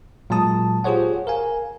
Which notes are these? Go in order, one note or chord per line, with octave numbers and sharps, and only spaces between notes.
A#2 F#3 G#3 A5 D#6
F4 G4 G#4 C5 C#5 F#5
A#4 F5 G#5